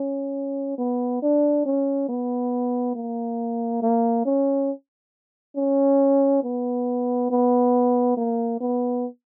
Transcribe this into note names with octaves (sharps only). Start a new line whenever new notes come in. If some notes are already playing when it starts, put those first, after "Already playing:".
Already playing: C#4
B3
D4
C#4
B3
A#3
A#3
C#4
C#4
B3
B3
A#3
B3